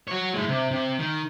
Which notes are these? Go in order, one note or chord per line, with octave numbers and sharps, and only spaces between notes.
F#4 C#5
A2 G#3
C3
C3
D#3